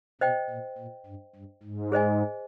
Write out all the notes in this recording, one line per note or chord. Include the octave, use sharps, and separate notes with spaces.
B2 C5 D#5 G5
A#2
A#2
G2
G2
G#2
G#4 C5 D#5 G#5